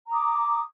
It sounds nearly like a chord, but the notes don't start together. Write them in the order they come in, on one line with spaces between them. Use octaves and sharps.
A#5 D#6 D6